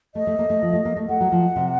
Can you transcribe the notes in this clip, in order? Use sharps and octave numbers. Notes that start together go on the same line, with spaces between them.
A3 D#5
A3
A#3
A3
F3
A3
A#3
A3
A3 F#5
F#3
F3
C3